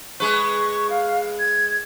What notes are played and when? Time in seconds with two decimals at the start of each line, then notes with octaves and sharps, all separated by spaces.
0.20 G#3 B4 C#6
0.90 F5
1.39 G#6